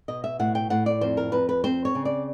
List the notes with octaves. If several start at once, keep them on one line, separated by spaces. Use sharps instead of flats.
B2 D#5
E5
A2 F#5
G5
A2 F#5
D5
F2 C5
A#4
F2 B4
B4
C4 C5
C#5
C#3
D5